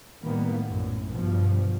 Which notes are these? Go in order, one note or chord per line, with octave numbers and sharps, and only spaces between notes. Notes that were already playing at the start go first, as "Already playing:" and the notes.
A2 D#3 G3 A#3 B3
A#1 F#2 A2
G2 B2 F3